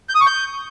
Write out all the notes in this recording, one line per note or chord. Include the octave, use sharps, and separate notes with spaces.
G6
D#6
C#6
G6